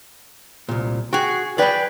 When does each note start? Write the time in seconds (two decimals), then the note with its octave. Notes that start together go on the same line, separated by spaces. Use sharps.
0.69 C2 A#2
1.13 F#4 G#4 G5
1.58 G#4 B4 D5 G5 B5